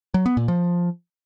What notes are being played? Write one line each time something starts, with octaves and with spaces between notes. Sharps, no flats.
F#3
B3
A#2
F3